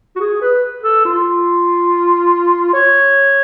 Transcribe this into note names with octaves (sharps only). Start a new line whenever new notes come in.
F#4
G#4
B4
A4
F4
C#5